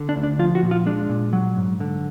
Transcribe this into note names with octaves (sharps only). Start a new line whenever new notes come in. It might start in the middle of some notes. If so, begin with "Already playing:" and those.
Already playing: D3
D4
D2
D4
F3 F4
F#4
A#2
F4
G#3 D4
A#2
F#3
G#2
D3